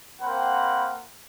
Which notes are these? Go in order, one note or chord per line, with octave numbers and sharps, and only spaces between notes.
A#3 C4 F#5 G5 B5